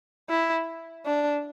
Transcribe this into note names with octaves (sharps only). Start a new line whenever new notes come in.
E4
D4